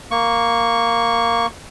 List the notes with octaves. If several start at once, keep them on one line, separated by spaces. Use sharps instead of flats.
A#3 C#6